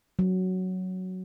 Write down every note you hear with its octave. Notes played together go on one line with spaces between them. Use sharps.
F#3